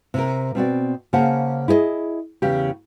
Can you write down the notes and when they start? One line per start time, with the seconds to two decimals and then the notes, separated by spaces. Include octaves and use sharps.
0.14 C3 A#4
0.55 B2 C4 F#4 D5
1.13 C#3 A#3 C5 F#5 A5
1.68 E4 G#4 C#5 D#5
2.42 E2 C#3 G4